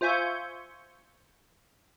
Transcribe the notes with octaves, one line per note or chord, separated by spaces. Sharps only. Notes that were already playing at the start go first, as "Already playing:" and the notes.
F4 C5 E5 G#5 C#6 G6